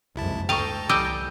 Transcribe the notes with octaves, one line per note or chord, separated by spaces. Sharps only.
F#1 C2 F2 G#2 E4 A5
D2 A4 D#5 F5 G5 A#5 C#6 A6
C2 E3 G3 D#5 G5 D6 E6 G6